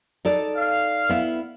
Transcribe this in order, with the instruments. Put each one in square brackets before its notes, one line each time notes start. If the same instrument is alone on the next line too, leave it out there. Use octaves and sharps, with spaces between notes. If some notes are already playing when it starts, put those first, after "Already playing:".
[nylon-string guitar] D#4 A4 D5
[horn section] F5
[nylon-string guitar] B3 E4